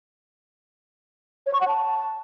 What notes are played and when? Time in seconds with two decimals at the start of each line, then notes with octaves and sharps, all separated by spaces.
1.46 C#5
1.53 C#6
1.61 F#5
1.68 A5